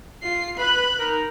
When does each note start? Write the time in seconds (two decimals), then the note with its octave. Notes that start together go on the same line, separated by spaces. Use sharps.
0.23 F4 C7
0.58 B4 B5 F#6
0.98 D#4 A#4